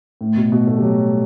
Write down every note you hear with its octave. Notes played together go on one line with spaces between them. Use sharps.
A2
B2
B2
A3
G3
F#3